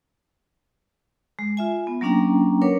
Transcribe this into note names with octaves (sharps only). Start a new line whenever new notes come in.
G#3
F4 E5 G#5
B3
F#3 A#3 C#4 D4 G5 A#5
C#4 A#4 B4 C#5 F#5 D6